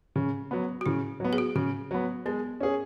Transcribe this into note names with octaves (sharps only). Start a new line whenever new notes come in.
C#3
F#3 B3
F#4
C#3 E4
F#3 B3
G#4
F#4
C#3 F#4
F#3 B3
G#3 B3
C#4 G#4